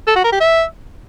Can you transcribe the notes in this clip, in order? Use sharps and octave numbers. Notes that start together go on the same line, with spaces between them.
A4
F#4
A#4
G4
E5